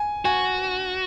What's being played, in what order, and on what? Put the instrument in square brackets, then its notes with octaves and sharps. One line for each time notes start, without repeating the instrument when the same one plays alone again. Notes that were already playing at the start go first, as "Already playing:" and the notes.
Already playing: [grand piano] G#5
[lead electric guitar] F#4 [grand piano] G#5